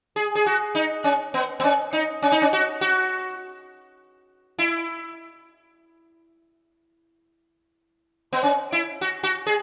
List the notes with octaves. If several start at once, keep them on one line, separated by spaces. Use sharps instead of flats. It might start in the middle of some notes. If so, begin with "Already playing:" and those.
G#4
G#4
F#4
D#4
C#4
B3
B3
C#4
D#4
C#4
D#4
C#4
F#4
F#4
E4
B3
C#4
E4
F#4
F#4
G#4